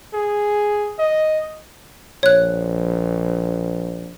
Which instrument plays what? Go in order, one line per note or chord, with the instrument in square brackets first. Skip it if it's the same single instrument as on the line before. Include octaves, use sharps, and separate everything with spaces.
[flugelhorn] G#4
D#5
[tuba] A#1 [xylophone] C#5 F#6